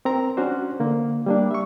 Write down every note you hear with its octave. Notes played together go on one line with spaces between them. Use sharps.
C4 A#4 A#5
C#4 D4 F#4 C5
D3 A#3
G3 A#3 D4
E5 C#6